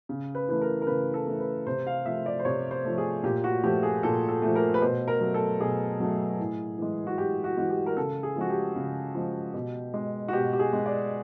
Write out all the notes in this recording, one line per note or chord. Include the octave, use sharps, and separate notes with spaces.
C#3
B4
E3 A3 B4
A#4
A#4
C#3 B4
A4
E3 A3
B4
C3 C5
F5
F3 A3 E5
D5
C5
C3 C#5
C5
F3 A3
G#4
A#2 G4
F#4
F3 A3 G4
G#4
A#2 A4
A4
F3 A3
A#4
B4
B2 C5
A#4
F#3 A3
A4
B2 G#4
F#3 A3
A2
E3 G#3
F#4
A2 G4
F#4
E3 G#3 F#4
G4
A#4
C#3 A4
G#4
F3 G#3 F#4
G4
C#3
F3 G#3
B2
G#3
F#4
B2 G4
G4
G#4
G#3
D5